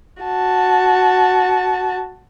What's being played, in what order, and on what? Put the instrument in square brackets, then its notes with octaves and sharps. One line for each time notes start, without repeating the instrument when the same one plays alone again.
[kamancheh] F#4 A5